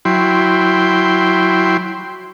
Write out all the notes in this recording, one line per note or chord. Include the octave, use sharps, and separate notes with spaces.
F#3 E4 G5 C6